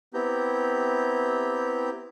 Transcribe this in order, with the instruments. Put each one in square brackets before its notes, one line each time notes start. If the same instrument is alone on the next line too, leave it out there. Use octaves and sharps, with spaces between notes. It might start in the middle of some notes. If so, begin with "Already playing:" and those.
[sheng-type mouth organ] B3 C4 E4 G4 A#5 G6